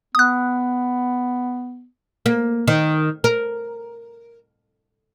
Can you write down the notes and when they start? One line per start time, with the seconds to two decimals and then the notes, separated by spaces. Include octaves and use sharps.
0.15 B3 D#6 F#6
2.26 A#3
2.68 D#3
3.24 A#4